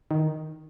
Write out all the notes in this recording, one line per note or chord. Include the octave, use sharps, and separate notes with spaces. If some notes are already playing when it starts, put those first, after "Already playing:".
D#3